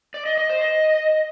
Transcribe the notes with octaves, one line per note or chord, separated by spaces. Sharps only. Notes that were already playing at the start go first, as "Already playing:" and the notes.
D5
D#5
D#5
C5
D#5